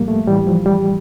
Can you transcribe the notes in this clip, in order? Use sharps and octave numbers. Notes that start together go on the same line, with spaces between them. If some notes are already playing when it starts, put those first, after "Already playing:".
Already playing: A2 F3 G3 A#3
A3
A2 E3 G3
F3
G3